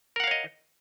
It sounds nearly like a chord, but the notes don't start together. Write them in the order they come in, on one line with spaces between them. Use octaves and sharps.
A#4 F#5 F5 C#5 D#5